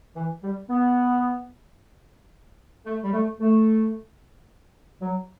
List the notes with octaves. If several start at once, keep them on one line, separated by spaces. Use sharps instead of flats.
E3
G3
B3
A3
G3
A3
A3
F#3